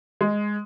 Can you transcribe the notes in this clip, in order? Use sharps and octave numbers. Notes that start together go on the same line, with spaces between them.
G#3